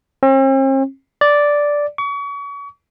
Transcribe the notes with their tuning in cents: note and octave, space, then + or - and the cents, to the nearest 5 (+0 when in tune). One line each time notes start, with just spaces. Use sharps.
C4 +45
D5 -5
C#6 +35